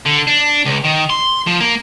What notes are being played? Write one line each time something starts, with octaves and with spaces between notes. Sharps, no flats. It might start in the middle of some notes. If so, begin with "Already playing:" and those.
D3
D4
C#2
D#3
C6
F3
A#3